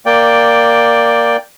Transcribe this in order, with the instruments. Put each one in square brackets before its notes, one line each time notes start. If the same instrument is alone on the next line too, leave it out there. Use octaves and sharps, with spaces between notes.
[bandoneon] A#3 D5 G5